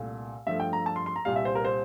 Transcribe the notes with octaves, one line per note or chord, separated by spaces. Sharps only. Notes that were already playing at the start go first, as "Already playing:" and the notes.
Already playing: C2 A#2 A3
G2 F3 A3 E5
G5
A#5
A5
C6
C6
A#5
C2 A#2 G3 F5
E5
C5
A#4
C5